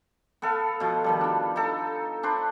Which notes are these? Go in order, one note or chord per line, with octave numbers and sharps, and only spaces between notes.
B3 A4 F5
B2 F3
D#3 F3 G3
B3 D4
D#4 A4
D4 B4 C5